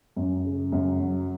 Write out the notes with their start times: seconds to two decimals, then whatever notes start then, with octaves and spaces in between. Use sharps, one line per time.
0.16 F#2
0.44 C#3
0.72 F#2
1.00 F#3